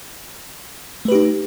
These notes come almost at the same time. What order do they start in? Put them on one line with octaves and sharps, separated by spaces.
A3 B4 G4 D#4